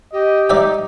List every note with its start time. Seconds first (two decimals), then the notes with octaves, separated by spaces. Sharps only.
0.13 G4 D#5
0.50 D#4 D5 E5 G5